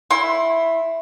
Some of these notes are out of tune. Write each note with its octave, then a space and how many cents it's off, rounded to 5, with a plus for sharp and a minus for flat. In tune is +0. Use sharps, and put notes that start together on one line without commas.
E4 +0 C6 +25